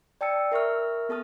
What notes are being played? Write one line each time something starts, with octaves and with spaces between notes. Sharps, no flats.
D5 G5 A5 E6 C#7
A#4 E5 C#6 F6
B3 A4 A5 D#6 F6